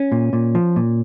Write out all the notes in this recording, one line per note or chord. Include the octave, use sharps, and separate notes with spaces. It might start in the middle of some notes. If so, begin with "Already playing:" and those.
Already playing: C#4
A#2
A#2
F3
A#2